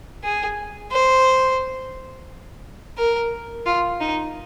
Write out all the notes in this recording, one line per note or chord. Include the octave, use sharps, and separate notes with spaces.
G#4
C5
A#4
F4
D#4